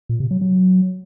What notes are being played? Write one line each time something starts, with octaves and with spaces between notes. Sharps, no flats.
A#2
C3
F#3
F#3